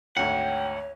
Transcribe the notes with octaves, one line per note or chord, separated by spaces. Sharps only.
G#1 D2 C#5 F#5 G5